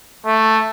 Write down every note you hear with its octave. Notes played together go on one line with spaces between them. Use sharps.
A3